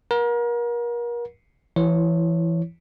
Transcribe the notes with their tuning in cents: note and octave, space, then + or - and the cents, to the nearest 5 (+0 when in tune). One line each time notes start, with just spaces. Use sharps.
A#4 +35 F#5 -35
E3 +25 E4 +0 C#5 +0